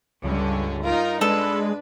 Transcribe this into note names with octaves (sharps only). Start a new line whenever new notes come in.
C#2 G2 D3 C#4
D#4 F4 A#4
G#3 D4 A4 B4